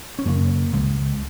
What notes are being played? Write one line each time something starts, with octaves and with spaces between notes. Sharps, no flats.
C#4
F#2 C#3 A#3
C#2 C#3 G#3